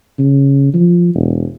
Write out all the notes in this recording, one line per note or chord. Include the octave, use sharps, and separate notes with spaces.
C#3
F3
E1